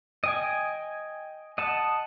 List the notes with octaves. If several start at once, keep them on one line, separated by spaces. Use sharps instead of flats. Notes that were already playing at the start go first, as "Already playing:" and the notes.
D#5 G5 G#5
D#5 F#5 A5